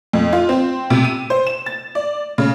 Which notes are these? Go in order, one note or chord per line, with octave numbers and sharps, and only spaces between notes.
F2
F4
C4
C3
D#7
C5
E7
A6
D5
C#3